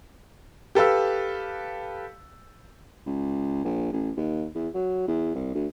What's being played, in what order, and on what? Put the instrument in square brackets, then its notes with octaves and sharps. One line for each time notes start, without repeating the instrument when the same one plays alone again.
[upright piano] G4 A4 B4 F5 E6
[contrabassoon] C#2
A#1
A1
D#2
E2
F#3
E2
C2
D2